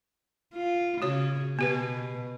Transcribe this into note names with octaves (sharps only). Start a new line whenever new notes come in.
F4
C#3 F#4 C#5
B2 B3 G4 B4